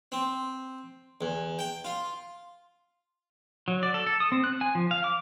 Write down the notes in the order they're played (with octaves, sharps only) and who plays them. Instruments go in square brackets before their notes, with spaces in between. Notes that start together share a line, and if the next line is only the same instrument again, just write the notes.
[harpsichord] C4
E2
G5
F4
[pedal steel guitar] F#3
D5
A4
A4
D#6
C4
F#6
G#5
F3
F5
D6